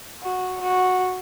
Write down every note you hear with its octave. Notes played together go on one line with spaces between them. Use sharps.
F#4
F#4